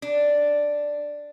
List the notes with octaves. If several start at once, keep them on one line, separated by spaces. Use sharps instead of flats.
D4